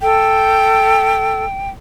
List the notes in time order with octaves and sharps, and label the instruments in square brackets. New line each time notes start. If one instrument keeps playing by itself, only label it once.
[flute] A4 [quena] G5